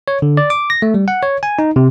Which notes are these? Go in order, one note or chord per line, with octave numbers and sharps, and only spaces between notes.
C#5
D3
D5
D6
A#6
A3
G3
F#5
C#5
G#5
D#4
C3